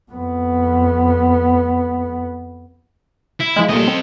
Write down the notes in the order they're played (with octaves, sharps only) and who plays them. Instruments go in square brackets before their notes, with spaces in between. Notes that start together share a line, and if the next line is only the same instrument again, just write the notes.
[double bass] F2 B3
[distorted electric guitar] E4
[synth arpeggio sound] F3 G#3
[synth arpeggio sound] A#2 G3 A3 [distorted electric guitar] A4 D#5
[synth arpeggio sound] C4